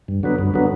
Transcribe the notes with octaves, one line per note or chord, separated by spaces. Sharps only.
G2
D3 F#3 B3
G2
D3 F#3 B3